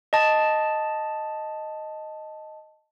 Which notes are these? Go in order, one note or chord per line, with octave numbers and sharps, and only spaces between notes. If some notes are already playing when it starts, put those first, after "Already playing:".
D#5 A5